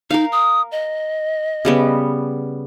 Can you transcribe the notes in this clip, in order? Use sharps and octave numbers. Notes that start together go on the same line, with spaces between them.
D#4 A#4 F5
D#6
D#5
C#3 G3 B3